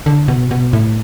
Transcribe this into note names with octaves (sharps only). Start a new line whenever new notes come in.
D3
B2
B2
A2